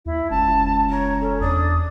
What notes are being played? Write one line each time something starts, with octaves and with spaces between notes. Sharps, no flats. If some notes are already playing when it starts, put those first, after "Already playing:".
D#2 E4
F1 C#2 A5
C#5 A#5
C#4 A4
E2 D4 D#6